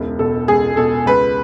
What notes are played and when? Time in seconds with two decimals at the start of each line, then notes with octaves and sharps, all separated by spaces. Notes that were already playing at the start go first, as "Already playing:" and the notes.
Already playing: E1 C#2
0.19 B2 A4
0.48 C#2 G#4
0.77 B2 A4
1.06 C#2 B4